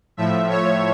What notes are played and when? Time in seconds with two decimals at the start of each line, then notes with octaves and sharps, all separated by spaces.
0.17 A2 F3 E5
0.50 C#5